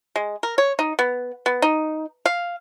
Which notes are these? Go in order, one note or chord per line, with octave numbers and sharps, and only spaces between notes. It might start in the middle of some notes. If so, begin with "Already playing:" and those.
G#3
A#4
C#5
D#4
B3
B3
D#4
F5